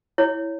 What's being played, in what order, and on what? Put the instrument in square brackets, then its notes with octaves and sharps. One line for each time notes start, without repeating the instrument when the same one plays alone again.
[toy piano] E4 C#5